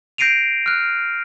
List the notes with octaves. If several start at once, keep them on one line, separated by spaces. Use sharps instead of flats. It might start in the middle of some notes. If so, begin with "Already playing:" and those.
G6 A#6 C7 D7 D#7 F7
F6 F#6